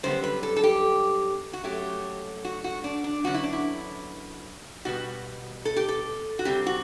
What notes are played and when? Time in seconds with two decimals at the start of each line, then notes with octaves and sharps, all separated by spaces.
0.03 F#2 D3 G3 B3 C5
0.24 B4
0.43 A4
0.56 A4
0.64 G4
1.53 F#4
1.64 F#2 F#3 A3 G4
2.45 F#4
2.64 F#4
2.84 D4
3.04 D4
3.24 F#2 D3 F#3 B3 F#4
3.34 E4
3.43 D4
3.53 E4
4.85 B2 G3 B3 F#4
5.65 A4
5.76 G4
5.88 A4
6.39 F#4
6.45 C3 G3 C4 G4
6.66 F#4